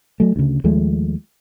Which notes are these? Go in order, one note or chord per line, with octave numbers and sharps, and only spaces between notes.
F#3 A3
D2 C#3
D#2 F3 G#3 A3